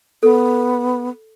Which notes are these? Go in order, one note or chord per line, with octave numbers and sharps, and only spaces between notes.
B3 A4